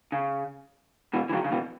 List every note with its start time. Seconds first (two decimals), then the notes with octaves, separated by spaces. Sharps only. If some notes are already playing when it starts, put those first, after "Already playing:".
0.12 C#3
1.13 B2 E3
1.29 E3
1.33 C#3 F#3
1.44 C#3
1.52 B2 E3